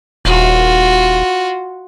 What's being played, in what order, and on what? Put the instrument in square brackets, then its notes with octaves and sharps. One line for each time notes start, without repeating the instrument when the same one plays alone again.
[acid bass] D#1 [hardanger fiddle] F4 F#4